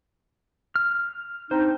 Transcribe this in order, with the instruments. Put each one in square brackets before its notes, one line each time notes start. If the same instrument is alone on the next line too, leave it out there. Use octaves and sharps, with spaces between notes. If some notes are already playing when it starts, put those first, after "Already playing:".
[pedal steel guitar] F6
[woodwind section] C4 D4 D#4 [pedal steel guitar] C5